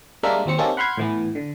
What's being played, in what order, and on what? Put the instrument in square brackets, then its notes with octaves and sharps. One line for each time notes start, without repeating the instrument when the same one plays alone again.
[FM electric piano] G3 G#3 A#3 D4 A#4 E5
D#2 F#3 C4 C#7
A#3 C4 C#4 D#4 G4 A4
F#5 B5 C6 F6 G6 G#6
A2 E3 B3
D3